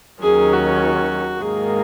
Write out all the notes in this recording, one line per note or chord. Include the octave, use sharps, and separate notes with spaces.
D#2 D#3 F#3 C#4 G#4
F#4
G#2 D#3 A#3 G#4